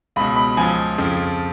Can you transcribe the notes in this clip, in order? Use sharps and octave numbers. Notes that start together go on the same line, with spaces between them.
C#2 B2 B5
B5
C#2 C#3 F3 G#5
F2 C#3 F3